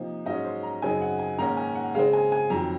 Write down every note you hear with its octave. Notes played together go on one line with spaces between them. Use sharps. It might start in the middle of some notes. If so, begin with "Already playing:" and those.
Already playing: C3 F3 A#3 D#4
G#2 F#3 C#4 D#5
C5
A#5
F#2 C#3 F#3 C4 D#4 G#5
F#5
G#5
G#2 D#3 A#3 C#4 A#5
G#5
F#5
C#3 G#3 C4 F5
G#5
G#5
F2 D#3 F#3 A#5